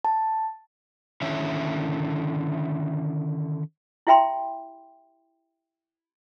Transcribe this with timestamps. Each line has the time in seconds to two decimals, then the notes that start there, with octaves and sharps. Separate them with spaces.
0.05 A5
1.22 D3 D#3 C#4 E4 E5
4.07 E4 G4 E5 G5 B5 C6